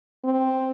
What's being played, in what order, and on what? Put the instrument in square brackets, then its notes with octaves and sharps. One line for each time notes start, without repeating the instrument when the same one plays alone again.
[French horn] C4